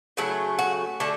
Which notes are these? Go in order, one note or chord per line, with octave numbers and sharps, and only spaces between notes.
C#3 F#3 A3 E4
F#4
D3 A3 A4